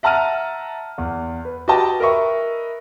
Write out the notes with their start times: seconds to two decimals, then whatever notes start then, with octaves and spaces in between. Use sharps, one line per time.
0.03 E5 F#5 A5 A#5 F6 D#7
0.98 E2
1.45 B4
1.68 F#4 G4 B4 D#5 G5 A5
2.00 A#4 B4 D#5 E5 C#6